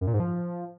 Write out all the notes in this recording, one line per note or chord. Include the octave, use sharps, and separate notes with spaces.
F#2
A#2
G#2
F3